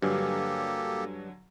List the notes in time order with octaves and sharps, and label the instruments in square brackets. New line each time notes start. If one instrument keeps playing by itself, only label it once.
[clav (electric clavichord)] G2 [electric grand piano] D3 F#3 G#5 [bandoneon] A#3 G4 A4